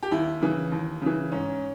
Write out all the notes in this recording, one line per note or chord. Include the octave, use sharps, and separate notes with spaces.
G4
D#2 E4
C#3 E3
D#2
C#3 E3
G#2 C#4